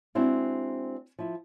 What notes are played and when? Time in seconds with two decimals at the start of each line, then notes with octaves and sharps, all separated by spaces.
0.15 G#3 C4 D4 E4 F#4
1.19 F3 E4